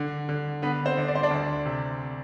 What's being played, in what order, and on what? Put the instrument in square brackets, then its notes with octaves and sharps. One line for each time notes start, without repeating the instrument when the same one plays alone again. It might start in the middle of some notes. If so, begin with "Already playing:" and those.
Already playing: [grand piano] D3
D3
D3 B3 B4
C4 C5
D3
D5
C5
D4 D5
D2
C3